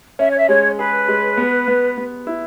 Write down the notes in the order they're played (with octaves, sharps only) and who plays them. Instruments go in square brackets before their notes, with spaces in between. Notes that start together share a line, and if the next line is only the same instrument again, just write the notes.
[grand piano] C#4 [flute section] E5
[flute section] C#5
E5
[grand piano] G#3 [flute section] C#5
[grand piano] G#4 [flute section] B4
[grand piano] G#3
B3
B3
B3
E4